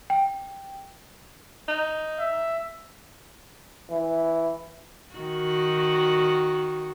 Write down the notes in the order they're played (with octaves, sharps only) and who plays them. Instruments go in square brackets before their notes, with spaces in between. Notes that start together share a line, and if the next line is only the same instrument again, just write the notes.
[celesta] G5
[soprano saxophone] D#4
[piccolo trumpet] E5
[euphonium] E3
[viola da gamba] D#3 F#4